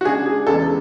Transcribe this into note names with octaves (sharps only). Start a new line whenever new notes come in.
F#4
C#3 G#3 D4 G#4
G#4
E2 C#3 G#3 D4 A4